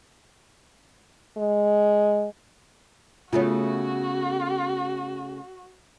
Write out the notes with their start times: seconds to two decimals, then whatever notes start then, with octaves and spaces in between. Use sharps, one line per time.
1.37 G#3
3.33 C#3 A3 B3 F4 F#4 C#5